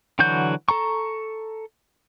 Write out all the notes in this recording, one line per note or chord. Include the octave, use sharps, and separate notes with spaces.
D3 E3 F#3 F#4 G6
A4 A#5 C#6